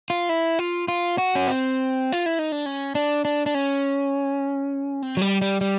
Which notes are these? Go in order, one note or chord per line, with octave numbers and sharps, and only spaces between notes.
F4
E4
F4
F4
F#4
C#4
C4
F4
E4
D#4
D4
C#4
D4
D4
D4
C#4
C4
F#3
G3
G3
G3